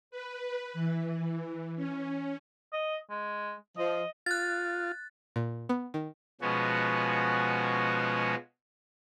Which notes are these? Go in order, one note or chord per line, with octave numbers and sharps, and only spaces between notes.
B4
E3
C#4
D#5
G#3
F3 D#5
F4 F#6 A6
A#2
B3
D#3
B2 F3 G#3 B3 C#4 F#4